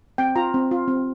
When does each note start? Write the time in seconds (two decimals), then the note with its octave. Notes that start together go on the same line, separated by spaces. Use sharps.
0.18 C4 G5
0.36 F4 A#5
0.54 C4
0.71 F4
0.88 C4